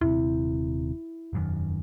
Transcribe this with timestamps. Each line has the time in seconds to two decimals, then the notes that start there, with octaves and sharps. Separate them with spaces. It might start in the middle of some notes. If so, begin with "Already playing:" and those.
0.01 D#1 C3 E4
1.33 E1 F#2 D#3